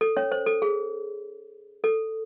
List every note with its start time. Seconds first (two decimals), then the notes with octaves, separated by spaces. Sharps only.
0.01 A4
0.17 C#4 C#5
0.32 C5
0.46 A4
0.62 G#4
1.84 A4